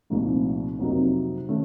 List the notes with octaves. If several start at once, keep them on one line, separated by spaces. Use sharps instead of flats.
C2 A#2 F3 A3 D#4
F2 C3 F#3 A#3 D#4
D#3 A3 C#4